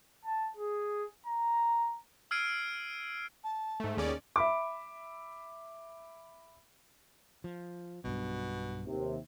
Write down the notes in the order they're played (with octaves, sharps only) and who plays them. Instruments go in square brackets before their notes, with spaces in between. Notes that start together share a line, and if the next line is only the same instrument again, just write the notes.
[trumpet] A5
G#4
A#5
[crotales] E6 F6 G#6 C7 D7 D#7
[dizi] A5
[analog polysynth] G#2 A3
[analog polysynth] D#2 C#4 D5 [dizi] G#4
[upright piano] E5 B5 D6
[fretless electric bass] F3
[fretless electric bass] B1 G2 [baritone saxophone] B2
[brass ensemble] D#2 C3